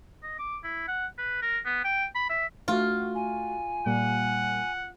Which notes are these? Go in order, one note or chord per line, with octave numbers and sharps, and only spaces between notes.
D#5
D6
E4
F#5
B4
A#4
B3
G5
B5
E5
A3 F4 F#4
G#5
A#2 G3 A#3 F#5